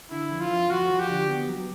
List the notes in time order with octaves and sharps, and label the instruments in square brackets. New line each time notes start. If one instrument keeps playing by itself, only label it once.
[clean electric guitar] D3 [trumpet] E4
[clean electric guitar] F2
[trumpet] F4
[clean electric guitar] F2
[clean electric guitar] F2 [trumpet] F#4
[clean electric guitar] F3
[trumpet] G4
[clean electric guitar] D3
B3
F#3